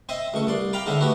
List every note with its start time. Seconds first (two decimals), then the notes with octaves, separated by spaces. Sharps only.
0.09 C4 C5 D#5 E5
0.34 C#2 A3 C#6
0.47 C2 D5 C6
0.73 F5 G5 A#5 B5 D6
0.86 G#2 D3 C4 E5
1.01 A3 B3 F#4 G4